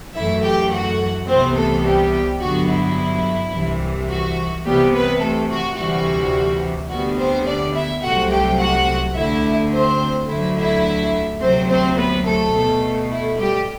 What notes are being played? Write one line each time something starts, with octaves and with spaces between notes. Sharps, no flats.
F#2 E3 A3 E4 E5
G4 G5
F#4 F#5
C2 C3 E3 B3 C4 C5
A3 A4
G3 G4
G2 D3 F#3 B3 F#4
E4
C2 C3 E3
F#4
C2 C3 E3 G3 B3 G4
B3 B4
A3 A4
F#4
D2 C3 E3 G3 F#4
D2 D3 G3 B3 F#4
C4 C5
D4 D5
E4 E5
C2 C3 F#3 A3 F#4 F#5
G4 G5
F#4 F#5
D2 D3 A3 E4 E5
C4 C5
D2 D3 F#3 A3 E4 E5
E4 E5
D2 C3 F#3 C4 C5
C4 C5
B3 B4
A3 A4
B2 A3
E4
G3 G4